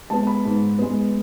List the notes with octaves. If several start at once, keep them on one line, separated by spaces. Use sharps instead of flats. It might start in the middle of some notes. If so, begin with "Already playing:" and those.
G#3 B3 A5
B5
G#2
G#3 B3